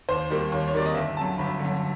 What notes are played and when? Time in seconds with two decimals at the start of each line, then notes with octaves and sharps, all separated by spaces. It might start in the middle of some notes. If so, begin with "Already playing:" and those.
0.09 D#2 C5
0.30 D#3 G3 A#3
0.52 D#2 C#5
0.68 C#5
0.73 D#3 G3 A#3 D5
0.85 D#5
0.95 G1 E5
1.17 F#2 D3 A5
1.38 G1 B5
1.60 D3
1.65 F#2